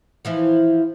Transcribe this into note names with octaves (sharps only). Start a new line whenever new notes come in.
E3 F3 E4